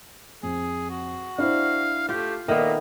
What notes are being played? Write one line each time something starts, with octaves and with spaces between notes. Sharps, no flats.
F2 G#4
F#4
D4 E4 C5 F5
A3 F4 G4
A#2 D#3 A#3 B3 A4 E5